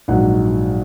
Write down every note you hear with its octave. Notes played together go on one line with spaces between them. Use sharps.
A#1 G#2 F#3 F#5